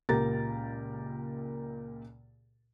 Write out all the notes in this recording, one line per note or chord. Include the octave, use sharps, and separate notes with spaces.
C#2 A#2 G4 A#4 A#5 A6